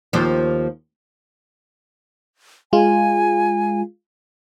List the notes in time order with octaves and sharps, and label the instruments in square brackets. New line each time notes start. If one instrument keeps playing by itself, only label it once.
[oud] D#2 F3
[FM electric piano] G#3 F4 [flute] G#5